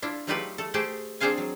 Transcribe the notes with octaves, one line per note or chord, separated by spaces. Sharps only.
D4 E4 F4
F#3 A3 D#4 F4 G4 B4
A3 A4
A3 G4 G#4 C5 G5 A5
C4 D4 G#4 C5 F5 G#5
F#3